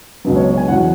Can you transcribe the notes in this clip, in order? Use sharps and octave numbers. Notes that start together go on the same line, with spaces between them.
C#2 B2 F#3 B4
C#5
C#5
G#5
E2 B2 F#3 F#5